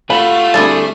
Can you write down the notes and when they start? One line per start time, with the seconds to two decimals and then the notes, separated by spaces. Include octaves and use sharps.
0.10 A3 F4 F#4 B5
0.54 D2 G3 C4 E4 G#4 A5